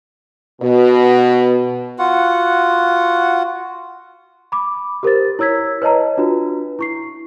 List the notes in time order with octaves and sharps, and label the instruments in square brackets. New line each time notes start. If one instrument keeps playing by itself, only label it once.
[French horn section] B2
[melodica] F4 F#4 F#5
[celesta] B5 D6
G4 A#4 C5 A6
E4 C#5 E6 G#6 B6
B4 C#5 D#5 A5 A#5
D4 F4 F#4 B4
E4 C#6 C7